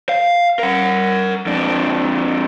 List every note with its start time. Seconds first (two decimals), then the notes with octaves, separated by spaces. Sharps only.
0.09 F5
0.59 A#4 F#5
1.46 F2 D4